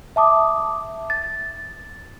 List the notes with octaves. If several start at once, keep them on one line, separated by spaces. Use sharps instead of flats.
E5 A5 D6 D#6
A6